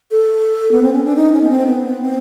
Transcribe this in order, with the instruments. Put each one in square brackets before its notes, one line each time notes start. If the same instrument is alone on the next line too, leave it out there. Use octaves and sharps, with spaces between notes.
[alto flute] A4
B3
C4
C#4
D4
D#4
C#4
B3
C4
B3
B3
C4